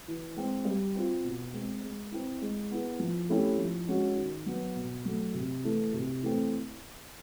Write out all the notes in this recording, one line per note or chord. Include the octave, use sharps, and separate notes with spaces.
E3
G#3 C4
G3
C4 F4
B2
G#3 C4
G#3
C4 E4
G#3
B3 E4 G#4
F3
A3 C#4 E4 G4
F3
G#3 C#4 F#4
D#3
F#3 B3
B2
F#3 A3
C3
E3 A3
C3
E3 A3 C4